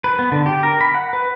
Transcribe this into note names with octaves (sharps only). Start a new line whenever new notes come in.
B4
B3
D3
G4
A#4
B5
F#5
B4